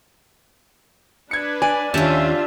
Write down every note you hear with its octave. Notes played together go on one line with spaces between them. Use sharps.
D4 B4 G#6 C#7
D5 G#5
D#2 C#4 D4 F4 G4 E5 A5